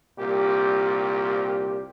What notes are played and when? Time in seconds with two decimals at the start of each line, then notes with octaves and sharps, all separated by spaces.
0.18 C2 A#2 G4